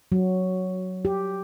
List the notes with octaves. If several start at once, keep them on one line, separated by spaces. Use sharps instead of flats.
F#3
G4